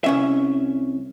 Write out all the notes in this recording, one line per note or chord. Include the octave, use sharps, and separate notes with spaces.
C2 C#4 E5